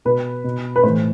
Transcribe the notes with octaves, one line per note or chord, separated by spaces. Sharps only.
B2 B4
B2
B4
A2 E3 C5